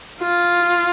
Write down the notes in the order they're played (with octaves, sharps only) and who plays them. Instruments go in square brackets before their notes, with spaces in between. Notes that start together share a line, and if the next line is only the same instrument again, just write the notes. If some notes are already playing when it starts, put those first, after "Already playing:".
[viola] F4